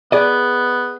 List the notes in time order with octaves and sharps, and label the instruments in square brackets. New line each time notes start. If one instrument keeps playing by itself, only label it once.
[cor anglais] B3 [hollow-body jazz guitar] G#4 D5 D#5